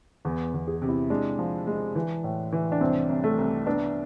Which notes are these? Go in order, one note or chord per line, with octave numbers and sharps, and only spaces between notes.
E2 B3
E2
G#4
C3
E4
G#3 D4
F3
G#3
E3
A2
E3
D4
C2 C4
C2
A3
C2
B3 D4